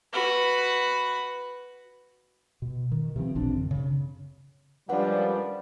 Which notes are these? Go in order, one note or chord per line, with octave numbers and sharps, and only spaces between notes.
F#4 B4
B2
D#3
C3 E3 F3 C4
A#1 C3 C4 D4
F#2 D3
C#3
F#2 D#3 F3 G3 G#3 D4 B4 F#5